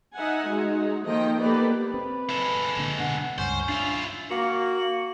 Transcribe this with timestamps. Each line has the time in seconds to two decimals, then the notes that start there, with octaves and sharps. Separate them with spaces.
0.15 D#4 E5 F#5 G#5
0.49 G#3 D#4 F#4
1.04 D#3 F3 A#3 A4 D#5 G5
1.40 A#3 B3 G4 A4 B4 D5
1.94 C4 B4
2.30 G#3 A4
2.77 A#2 D3
2.99 B2 D3 F#5
3.38 C#2 G2 C#4 C5
3.69 D4 E4 F4
4.31 A#3 F#4